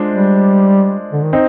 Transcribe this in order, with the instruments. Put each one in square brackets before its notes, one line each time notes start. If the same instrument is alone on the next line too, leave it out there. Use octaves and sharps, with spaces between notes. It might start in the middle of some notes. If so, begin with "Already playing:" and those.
Already playing: [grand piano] G#3 D4 F4 C5
[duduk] G3
D3
D#3
[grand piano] C4 D#4